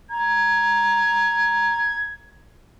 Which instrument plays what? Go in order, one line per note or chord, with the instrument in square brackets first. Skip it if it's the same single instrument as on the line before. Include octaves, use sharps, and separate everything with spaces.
[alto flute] A#5 [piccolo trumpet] G#6